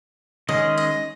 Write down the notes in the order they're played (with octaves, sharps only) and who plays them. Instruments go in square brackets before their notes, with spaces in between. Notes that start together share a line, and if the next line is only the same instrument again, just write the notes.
[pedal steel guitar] D#3 G#3 C#4 G#4 [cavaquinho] D#5
[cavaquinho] D#5